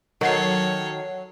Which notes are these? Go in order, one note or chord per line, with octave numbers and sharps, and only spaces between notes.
D#3 F#3 A4 C#5 C7